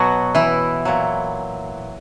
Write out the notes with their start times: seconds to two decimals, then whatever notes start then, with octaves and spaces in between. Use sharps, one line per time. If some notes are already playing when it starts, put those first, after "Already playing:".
Already playing: B2 F#3 F#4
0.35 E3 E4
0.85 A#2 F#3